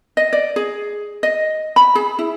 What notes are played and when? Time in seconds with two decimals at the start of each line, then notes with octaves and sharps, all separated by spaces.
0.17 D#5
0.33 D5
0.56 G#4
1.23 D#5
1.76 B5
1.95 G#4
2.19 E4